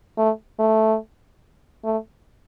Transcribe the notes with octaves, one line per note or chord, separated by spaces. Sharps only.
A3
A3
A3